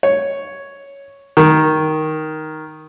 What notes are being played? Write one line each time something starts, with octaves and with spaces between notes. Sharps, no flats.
C#5
D#3